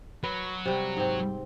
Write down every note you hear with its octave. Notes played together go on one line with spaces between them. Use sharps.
F#3 B4
C3 G3
G#2 C4